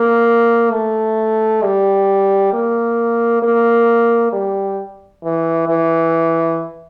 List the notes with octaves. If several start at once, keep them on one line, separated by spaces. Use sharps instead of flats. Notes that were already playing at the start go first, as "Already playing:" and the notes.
Already playing: A#3
A3
G3
A#3
A#3
G3
E3
E3